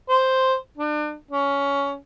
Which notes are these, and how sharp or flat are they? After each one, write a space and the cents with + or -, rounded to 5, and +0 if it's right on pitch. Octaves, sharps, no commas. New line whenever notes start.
C5 +0
D4 +35
C#4 +15